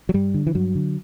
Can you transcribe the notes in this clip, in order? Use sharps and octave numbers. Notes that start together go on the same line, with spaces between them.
F#3
G2 G3
D3
E3
G2 F#3
D3